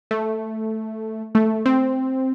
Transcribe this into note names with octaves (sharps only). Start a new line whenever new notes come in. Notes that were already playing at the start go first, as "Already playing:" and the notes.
A3
A3
C4